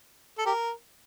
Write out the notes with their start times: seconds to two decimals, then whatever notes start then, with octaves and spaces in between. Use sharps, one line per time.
0.38 A4
0.46 G4 A#4